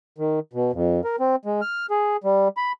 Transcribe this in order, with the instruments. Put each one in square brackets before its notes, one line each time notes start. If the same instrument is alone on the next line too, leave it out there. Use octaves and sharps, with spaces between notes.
[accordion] D#3
B2
F2
A#4
C4
G#3
F6
G#4
G3
B5